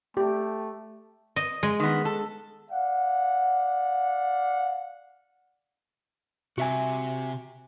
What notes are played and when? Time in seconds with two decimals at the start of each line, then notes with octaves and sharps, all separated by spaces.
0.17 A3 G4
1.36 D#5
1.63 G#3
1.80 D#3 B3
2.05 A4
2.70 D5 F5 F#5
6.58 C3 F#4 E5 G#5